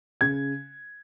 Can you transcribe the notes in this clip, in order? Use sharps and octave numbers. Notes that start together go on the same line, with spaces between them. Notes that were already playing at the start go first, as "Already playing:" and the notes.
C#3 G#6